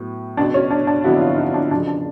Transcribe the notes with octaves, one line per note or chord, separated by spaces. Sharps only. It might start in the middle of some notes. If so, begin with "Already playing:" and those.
Already playing: A2 F#3 B3
C#2 B2 F#3 D4
C#4
D4
D4
F2 D3 F#3 B3 E4 F#4
F4
D#4
D4
F#1 E2 C#3 F3 D4
D4